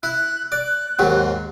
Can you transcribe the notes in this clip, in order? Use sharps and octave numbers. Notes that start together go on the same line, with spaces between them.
E4 F#6
D5 F#6
D#2 G#2 F#3